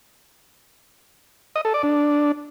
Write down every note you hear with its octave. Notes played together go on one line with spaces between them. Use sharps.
D#5
A4
D5
D4